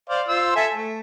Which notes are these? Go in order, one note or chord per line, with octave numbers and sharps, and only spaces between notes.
C5 D5 F5
F4 C5 E6
A4 E5 G#5
A3